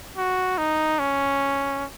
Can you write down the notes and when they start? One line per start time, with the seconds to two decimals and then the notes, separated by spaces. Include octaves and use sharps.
0.17 F#4
0.58 D#4
0.99 C#4